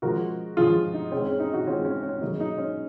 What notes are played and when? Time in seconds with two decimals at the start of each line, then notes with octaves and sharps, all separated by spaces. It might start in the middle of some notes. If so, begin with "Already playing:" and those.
0.02 C#3 F3 G#3 F#4 A#4
0.57 C#3 F3 G#3 F4 G#4
0.94 D#4
1.11 C#3 G#3 C4 C#4
1.26 C#4
1.40 D#4
1.53 D#4 F#4
1.67 C#3 G#3 C4 C#4 F4
1.85 C#4
2.03 C#4
2.22 C#3 F#3 A#3 D#4
2.40 D#4
2.58 C#4